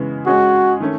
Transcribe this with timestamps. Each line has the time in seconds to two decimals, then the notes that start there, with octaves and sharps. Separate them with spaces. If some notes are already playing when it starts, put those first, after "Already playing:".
Already playing: C#3 E3 G#3 B3
0.26 G#3 C#4 F#4 G#4
0.80 D#3 A3 C#4